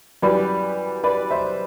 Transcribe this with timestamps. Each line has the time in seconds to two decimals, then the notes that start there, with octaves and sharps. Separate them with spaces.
0.22 F#2 E3 G3 B4 D5
1.04 B4 D5
1.31 C5 E5